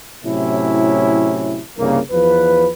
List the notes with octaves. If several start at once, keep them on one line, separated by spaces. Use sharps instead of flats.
A2 C3 F#3 C#4 E4
C2 G2 C#3 A#3
E2 F3 B4